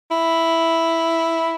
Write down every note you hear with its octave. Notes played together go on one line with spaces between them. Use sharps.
E4